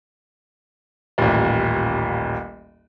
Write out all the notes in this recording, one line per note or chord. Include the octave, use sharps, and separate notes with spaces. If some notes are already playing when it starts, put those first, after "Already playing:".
D#1 A1